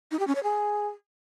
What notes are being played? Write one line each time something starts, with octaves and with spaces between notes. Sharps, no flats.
D#4
G4
C#4
C#5
G#4